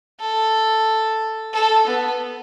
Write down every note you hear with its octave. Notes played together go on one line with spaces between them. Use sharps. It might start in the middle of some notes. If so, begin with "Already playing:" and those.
A4
A4
B3